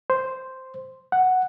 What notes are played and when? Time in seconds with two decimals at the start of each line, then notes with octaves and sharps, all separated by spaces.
0.10 C5
1.12 F#5